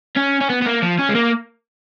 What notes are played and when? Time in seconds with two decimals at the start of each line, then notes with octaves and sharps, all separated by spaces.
0.17 C#4
0.41 C#4
0.50 B3
0.62 B3
0.66 A#3
0.82 F3
0.99 C#4
1.09 G#3
1.15 A#3